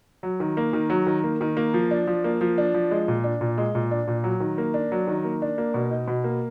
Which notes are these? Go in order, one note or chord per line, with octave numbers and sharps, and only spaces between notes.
F#3
D#3
A#3
D#3
F#3
D#3
A#3
D#3
A#3
F3
D4
F3
A#3
F3
D4
F3
G#3
A#2
D4
A#2
G#3
A#2
D4
A#2
F#3
D#3
A#3
D4
F#3
D#3
A#3
D4
A#3
B2
D#4
B2
A#3